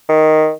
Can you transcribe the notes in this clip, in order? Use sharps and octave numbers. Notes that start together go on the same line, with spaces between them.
D#3